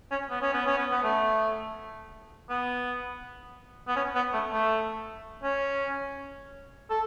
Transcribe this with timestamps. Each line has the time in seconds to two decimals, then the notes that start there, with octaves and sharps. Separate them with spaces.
0.11 C#4
0.30 B3
0.42 C#4
0.53 B3
0.66 C#4
0.77 B3
0.91 B3
1.03 A3
2.49 B3
3.88 B3
3.96 C#4
4.15 B3
4.33 A3
4.52 A3
5.43 C#4
6.90 A4